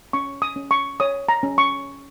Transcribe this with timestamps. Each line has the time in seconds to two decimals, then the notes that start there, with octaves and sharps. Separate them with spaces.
0.13 C#4 C#6
0.42 D#6
0.56 C#4
0.71 C#6
1.00 C#5 D#6
1.29 A#5
1.43 C#4
1.58 C#6